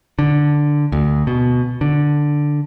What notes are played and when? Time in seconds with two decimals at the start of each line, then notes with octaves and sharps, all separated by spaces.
0.19 D3
0.92 D2
1.27 B2
1.81 D3